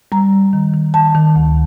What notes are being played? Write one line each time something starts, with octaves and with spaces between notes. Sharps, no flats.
G3 A#5
G3
D#3
D#3
D#3 A5
D#3
D2